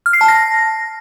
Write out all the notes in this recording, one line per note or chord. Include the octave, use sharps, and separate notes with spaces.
F6
C7
A5
A#6